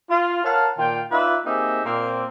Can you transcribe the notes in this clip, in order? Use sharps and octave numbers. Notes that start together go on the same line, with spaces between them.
F4
A#4 C#5 F5 F#5 A5
A#2 D#3 F4 G5
D#4 F4 B4 D5 E5
A#3 C4 D#4 G4 G#4 E5
A#2 A#3 C4